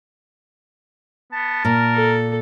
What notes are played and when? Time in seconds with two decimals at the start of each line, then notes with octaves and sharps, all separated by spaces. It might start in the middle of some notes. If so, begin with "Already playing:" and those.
1.32 B3 A5
1.65 A#2 A#4
1.96 A4